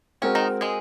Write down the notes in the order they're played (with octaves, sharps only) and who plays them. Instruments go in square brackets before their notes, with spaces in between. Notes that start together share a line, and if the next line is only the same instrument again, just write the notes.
[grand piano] G#3 C4 F#4 A#4 [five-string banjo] C#4
[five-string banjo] D#3 D#4
G#3 G#4